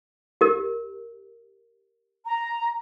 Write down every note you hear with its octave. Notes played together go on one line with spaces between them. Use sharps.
G4 A#4
A#5